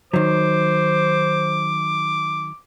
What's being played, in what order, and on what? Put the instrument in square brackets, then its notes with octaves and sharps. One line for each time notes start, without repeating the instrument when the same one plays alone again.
[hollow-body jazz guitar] D#3 F#3 [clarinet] C5 [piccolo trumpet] D6